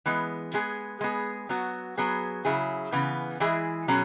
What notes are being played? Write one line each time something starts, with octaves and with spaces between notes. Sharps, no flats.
E3 G#3 B3
G#3 B3 G#4
G#3 B3 G#4
F#3 B3 F#4
F#3 B3 G#4
C#3 F#3 E4 G#4
C#3 E3 B3
E3 G#3 E4 G#4
B2 F#3 C#4 G#4